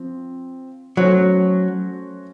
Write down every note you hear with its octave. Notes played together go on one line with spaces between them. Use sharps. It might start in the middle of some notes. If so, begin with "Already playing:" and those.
Already playing: F3 C4
F#3 A3 C#4 F#4 C5